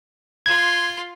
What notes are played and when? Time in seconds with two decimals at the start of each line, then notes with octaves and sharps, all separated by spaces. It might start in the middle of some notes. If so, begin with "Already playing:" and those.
0.46 F4 C6 G#6